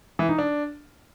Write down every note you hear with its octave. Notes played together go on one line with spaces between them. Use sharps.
E3
D#4
D4